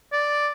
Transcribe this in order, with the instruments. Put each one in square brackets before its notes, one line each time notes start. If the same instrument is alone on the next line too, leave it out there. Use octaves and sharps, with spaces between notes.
[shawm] D5